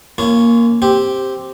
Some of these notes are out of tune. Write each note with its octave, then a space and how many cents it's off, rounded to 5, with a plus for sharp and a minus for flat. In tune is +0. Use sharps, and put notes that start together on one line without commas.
A#3 +0 C#4 +0 F4 -35
C4 +0 G4 +0